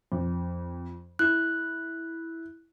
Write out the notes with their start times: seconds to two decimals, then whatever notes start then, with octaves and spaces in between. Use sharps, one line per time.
0.12 F2
1.19 E4 F#6